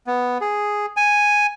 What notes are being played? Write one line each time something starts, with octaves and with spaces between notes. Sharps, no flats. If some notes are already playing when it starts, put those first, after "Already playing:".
B3
G#4
G#5